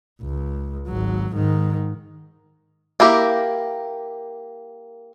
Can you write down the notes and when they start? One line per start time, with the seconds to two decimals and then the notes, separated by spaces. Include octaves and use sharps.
0.22 C#2
0.88 G#1 F#3
1.34 G#2 D#3
3.00 A#3 E4 G4 A#4